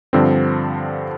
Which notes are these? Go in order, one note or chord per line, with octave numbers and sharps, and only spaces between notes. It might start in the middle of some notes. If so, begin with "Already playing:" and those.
G2 D3 F3 C4